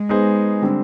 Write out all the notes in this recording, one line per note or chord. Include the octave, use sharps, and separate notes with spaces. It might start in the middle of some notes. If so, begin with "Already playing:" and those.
Already playing: G#3
B3 D#4 G#4 C5
D3 G3 C4